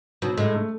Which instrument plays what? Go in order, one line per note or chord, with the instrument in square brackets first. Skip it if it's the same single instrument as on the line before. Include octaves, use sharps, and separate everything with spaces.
[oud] B2 [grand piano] F#3
[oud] A2 [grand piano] G#3
[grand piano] A3